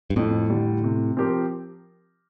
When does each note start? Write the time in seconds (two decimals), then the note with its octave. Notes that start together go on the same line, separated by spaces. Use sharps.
0.10 G2
0.16 F2 A2
0.50 D3 G3
0.84 C3
1.17 F3 C4 G4 A#4